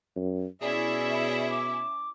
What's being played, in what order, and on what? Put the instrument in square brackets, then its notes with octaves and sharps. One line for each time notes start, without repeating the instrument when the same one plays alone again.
[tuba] F#2
[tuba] B2 [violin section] C#4 E4 E5 [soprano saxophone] G#4 [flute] D5
[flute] D6